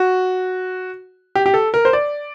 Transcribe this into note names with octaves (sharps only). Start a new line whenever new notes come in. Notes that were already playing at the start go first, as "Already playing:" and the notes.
Already playing: F#4
G4
G4
A4
A#4
C5
D5